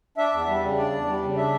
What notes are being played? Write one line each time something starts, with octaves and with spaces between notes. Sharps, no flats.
D4 E5
E2
G3
C#3
D4 D5
E2
G3
C#3
D4 E5